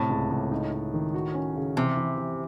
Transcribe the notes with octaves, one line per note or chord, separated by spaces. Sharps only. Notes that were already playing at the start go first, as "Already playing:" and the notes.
Already playing: A2 C3
C#2
C#2
D#4
D#4
D#3
F#4
C#4
C#3
C3 E3
E3
E3